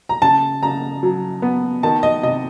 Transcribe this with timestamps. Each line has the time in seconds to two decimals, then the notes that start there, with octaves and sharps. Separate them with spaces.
0.09 A#5
0.22 C#3 A5
0.63 C#3 A#5
1.03 F#3
1.42 B3
1.83 D#3 A5
2.03 D#5
2.23 C3 D#5